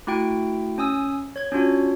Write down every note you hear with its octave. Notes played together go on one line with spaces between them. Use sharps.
A3 E4 F#4 G5 D7
C#4 G#5 D#6 E6
C#5 G#6
C#4 D4 F4 F#4 C#5